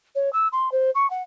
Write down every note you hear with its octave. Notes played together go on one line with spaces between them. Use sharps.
C#5
E6
C6
C5
C#6
F#5